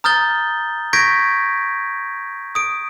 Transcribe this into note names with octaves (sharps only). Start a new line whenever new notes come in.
A#5 D#6 F6 G6 A6 G7
C#6 G6 G#6 A#6 B6 D7
D#6 D7